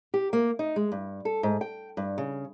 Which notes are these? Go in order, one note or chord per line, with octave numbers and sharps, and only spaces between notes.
G4
A#3
D#4
G#3
G2
A4
G#2
G5
G2
C#3